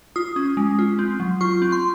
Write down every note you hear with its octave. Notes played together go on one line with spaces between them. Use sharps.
F4 D#6
C#4
G#3
F4
C4
F#3
F4 C#6
C4
C6